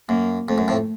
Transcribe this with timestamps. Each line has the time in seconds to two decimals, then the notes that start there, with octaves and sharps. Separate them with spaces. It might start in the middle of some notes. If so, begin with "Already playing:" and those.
0.09 F#2 A#3
0.48 F2 A3
0.58 F#2
0.68 F2 A2